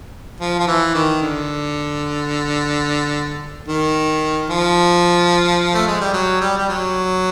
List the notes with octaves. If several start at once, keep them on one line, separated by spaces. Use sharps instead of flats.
F3
F3
E3
D#3
D3
D#3
F3
A3
G#3
G3
F#3
G3
G3
F#3